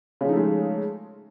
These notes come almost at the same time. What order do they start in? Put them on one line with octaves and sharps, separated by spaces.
C#3 F3 D#4 A3 G#3